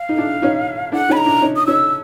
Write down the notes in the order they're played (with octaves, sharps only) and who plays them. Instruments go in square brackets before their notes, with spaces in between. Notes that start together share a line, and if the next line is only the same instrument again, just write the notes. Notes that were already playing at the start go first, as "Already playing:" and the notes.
Already playing: [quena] F5
[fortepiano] D#4
D4 E4
C#4 D#4
[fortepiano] D4 E4 [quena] F#5
[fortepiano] C#4 D#4 [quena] B5
[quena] A#5
[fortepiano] D4 E4
C#4 D#4
[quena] D#6
[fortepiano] C#4 D#4 [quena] E6